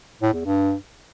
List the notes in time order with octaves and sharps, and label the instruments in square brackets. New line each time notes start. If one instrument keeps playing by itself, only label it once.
[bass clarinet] A2
E2
G2